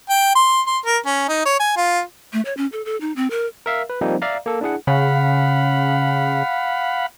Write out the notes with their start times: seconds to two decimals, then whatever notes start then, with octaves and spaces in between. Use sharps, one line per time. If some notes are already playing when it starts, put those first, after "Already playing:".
0.09 G5
0.36 C6
0.67 C6
0.86 A#4
1.06 C#4
1.28 D#4
1.46 C#5
1.60 G#5
1.77 F4
2.33 A3
2.45 C#5
2.57 C#4
2.72 A4
2.85 A4
3.01 D#4
3.16 C4
3.31 A#4
3.66 A#4 E5 F5
3.90 B4
4.01 F3 G3 A#3 C4 D#4
4.22 D5 E5 F5 A#5
4.46 A#3 A4
4.61 D4 E4 G#4 F#5
4.87 C#3 F5 F#5 B5